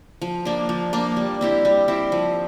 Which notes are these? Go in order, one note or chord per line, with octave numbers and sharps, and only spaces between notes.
F3
A#3 D4
F3
A#3 D4
G3
C4 E4 G4
G3
C4 E4 G4
F3